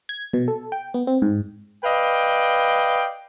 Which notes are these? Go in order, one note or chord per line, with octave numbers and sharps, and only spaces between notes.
G#6
B2
A4
G5
B3
C4
G#2
B4 D5 D#5 F5 G5